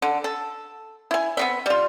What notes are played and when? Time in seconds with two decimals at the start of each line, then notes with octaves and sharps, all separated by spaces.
0.02 D3
0.24 A4
1.11 E4 G#5
1.37 B3 C4 E5
1.66 G3 F4